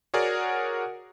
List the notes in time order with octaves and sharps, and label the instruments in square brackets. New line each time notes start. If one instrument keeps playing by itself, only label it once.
[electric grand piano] F#4 G#4 A#4 C#5 D5 F#5